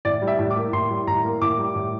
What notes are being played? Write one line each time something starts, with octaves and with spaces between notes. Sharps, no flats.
A2 D5
G3
E5
A2
D6
A#3
A2 C6
G3
A2 A#5
A#3
A2 D6
G3
A2